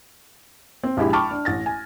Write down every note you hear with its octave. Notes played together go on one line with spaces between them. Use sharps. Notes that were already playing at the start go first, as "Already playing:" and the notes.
C4
A#1 G#3 E4 G4 B5
G5 A5 B5 C#6 D6 F6
D4
A1 A6 A#6
G#5